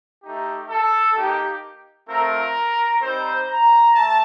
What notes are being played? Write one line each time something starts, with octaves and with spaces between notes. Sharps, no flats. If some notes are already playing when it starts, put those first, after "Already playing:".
A3 D#4 G4
A4
A#3 D#4 G4
A3 C4 F4 A#4
G3 C4 D#4 C5
A#5
A3 A5